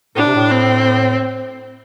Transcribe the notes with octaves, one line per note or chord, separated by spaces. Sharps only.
A2 D4
C3
A2
C4